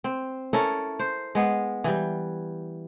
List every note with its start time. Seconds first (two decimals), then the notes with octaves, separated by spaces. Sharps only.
0.04 C4
0.53 C#4 E4 A4 A#4
0.99 C5
1.35 G#3 B3
1.84 E3 G3